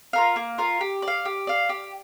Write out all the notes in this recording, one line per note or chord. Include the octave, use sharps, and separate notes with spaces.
F4 A#4 F5
A#3
F4 A#4 F5
G4
D5
F5
G4
D5 F5
G4